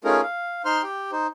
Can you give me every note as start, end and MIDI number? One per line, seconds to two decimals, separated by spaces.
0.04 0.21 57
0.04 0.21 61
0.04 0.21 63
0.04 0.21 65
0.04 0.21 68
0.04 0.21 70
0.22 0.62 77
0.65 0.82 63
0.65 0.82 72
0.65 0.82 84
0.65 0.82 89
0.83 1.11 67
0.83 1.11 79
1.12 1.27 63
1.12 1.27 72